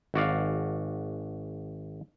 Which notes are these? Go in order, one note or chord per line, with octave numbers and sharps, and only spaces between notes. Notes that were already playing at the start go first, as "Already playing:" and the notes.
G#1 F#4 D5 F5